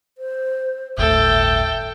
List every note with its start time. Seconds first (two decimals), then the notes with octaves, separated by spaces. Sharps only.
0.18 C5
0.98 G1 D2 A2 A4 E5 G5